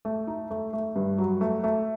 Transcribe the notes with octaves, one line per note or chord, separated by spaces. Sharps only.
A3
D#4
A3
A3
G2
F#3
A3
A3